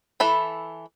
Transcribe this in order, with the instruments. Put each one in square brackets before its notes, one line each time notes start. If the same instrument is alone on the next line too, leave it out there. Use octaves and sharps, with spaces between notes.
[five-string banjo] E3 A4 B5